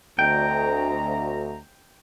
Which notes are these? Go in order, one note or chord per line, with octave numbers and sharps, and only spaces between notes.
D2 C4 D#5 G5 A#5